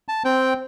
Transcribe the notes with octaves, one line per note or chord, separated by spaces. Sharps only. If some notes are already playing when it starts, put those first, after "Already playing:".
A5
C4 G5